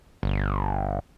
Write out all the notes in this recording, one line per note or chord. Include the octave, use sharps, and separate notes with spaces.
G1